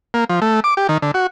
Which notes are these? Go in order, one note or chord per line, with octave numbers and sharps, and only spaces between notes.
A#3
F3
A3
D6
G4
D#3
D3
F#4